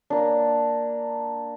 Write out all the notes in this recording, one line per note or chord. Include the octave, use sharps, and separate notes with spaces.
A#3 D4